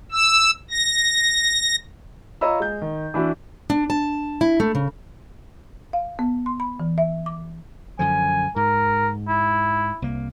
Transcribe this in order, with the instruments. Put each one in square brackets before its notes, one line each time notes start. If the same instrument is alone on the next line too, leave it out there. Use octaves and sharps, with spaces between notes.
[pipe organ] E6
A#6
[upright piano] F4 C#5 D#5 A#5 B5 E6
G#3 G6
D#3
E3 D4 E4 F#4
[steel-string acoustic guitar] D4
A5
E4
A3
C#3
[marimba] F5
B3
C6
B5
E3
E5
D6
[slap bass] F#2 D3 F3 [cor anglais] G#5
[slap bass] G#2 [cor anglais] A#4
[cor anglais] E4
[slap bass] C2 A#3